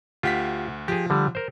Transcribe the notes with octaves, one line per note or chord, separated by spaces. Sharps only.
D2 F4 G4 F#5 B6
F3 G4 G#4
D3 G3
A#4 C5